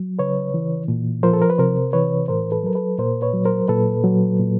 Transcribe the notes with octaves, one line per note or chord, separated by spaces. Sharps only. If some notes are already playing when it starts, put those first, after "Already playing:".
Already playing: F#3
C#3 B4 C#5
E3
A#2
F3 A#4 C5
A4
A#4
B4
C3 A#4 C5
E3 B4 C#5
A2 A#4 C5
A4 B4
F#3 A#4
A4 B4
A#2 A#4 C5
B4 C#5
F#3
A#4 C5
A#2 A4 B4
F#3
A#2